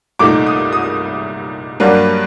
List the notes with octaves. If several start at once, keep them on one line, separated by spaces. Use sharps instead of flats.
C2 A#2 A3 D#4 D6
D#6
D#6
G2 F#3 A#3 D4